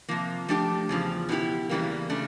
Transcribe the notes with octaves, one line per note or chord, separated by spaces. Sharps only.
C3 F3 A#3
F3 A3 D4 G4
E2 C#3 F3
B2 G#3 B3 E4 G4
E2 C#3 E3 G3 A#3
C#3 A3 D4